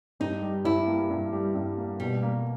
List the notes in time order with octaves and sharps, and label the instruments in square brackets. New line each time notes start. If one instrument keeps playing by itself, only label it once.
[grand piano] G2 [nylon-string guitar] D#4
[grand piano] G3
[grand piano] G2 [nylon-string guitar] E4
[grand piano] A#3
G2
G3
G2
A#3
[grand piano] B2 [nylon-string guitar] G3
[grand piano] A#3